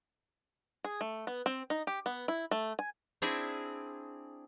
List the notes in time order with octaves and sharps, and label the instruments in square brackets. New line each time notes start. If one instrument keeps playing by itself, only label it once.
[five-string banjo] G#4
A3
B3
C4
D#4
G4
B3
E4
A3
G#5
[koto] C4 D4 E4 G#4